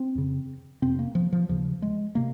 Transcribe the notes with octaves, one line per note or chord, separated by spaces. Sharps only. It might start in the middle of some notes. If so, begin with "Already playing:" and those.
Already playing: C4
F2 C#3
F2 C3 C4
A#3
F3
F3
D#2 C#3 F3
G#3
C3 A#3